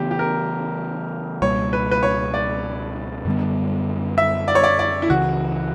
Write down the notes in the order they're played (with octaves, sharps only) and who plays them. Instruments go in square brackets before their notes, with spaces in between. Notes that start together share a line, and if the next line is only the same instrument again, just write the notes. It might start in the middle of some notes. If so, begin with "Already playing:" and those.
Already playing: [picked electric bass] C#3 E3 B3 [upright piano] G4
[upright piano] G4
A#4
[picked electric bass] C#2 B2 G3 A#3 [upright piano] C#5
[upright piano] B4
B4
C#5
D5
[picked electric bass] F#2 D3 G3 B3
[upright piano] E5
D5
C#5
D5
D5
E4
[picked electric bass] C#2 C#3 E3 [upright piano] F#4